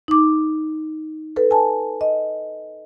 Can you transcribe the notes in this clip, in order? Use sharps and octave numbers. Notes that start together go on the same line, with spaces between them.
D#4 D6
A4 B4
G#5 A5
D#5